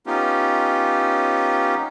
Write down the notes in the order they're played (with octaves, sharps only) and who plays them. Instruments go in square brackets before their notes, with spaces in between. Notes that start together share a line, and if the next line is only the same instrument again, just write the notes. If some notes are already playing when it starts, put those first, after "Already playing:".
[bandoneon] B3 C#4 D#4 F4 G4